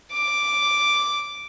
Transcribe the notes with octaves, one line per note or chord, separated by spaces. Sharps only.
D6